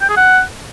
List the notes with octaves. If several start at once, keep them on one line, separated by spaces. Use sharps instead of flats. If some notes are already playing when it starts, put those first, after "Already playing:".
G5
G#4
F#5